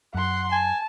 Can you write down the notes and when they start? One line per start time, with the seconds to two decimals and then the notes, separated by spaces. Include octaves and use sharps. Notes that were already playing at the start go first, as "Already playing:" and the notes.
0.14 F#2 F#5 C6
0.52 G#5 A5